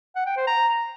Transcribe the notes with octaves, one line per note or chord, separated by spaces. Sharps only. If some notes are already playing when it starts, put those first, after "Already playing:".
F#5
G5
C5
A#5